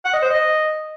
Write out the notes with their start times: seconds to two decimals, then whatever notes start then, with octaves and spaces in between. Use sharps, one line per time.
0.05 F#5
0.14 D#5
0.22 C5
0.31 D#5